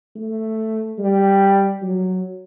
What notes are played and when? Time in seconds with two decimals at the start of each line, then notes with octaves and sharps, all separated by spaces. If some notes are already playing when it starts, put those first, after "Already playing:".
0.16 A3
0.98 G3
1.82 F#3